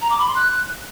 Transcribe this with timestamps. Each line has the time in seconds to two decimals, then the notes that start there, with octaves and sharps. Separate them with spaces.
0.01 A#5
0.10 D6
0.19 B5
0.27 C6
0.36 F#6